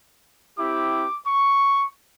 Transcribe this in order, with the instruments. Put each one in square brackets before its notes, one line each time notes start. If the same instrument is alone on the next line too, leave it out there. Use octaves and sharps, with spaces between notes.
[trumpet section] C4 E4 G4 D6
C#6